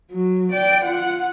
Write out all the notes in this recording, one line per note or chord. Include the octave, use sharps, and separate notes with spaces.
F#3
D5 G5
F4 F#5